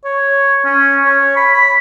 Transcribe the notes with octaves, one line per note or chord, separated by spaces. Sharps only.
C#5
C#4
C#5
B5
B5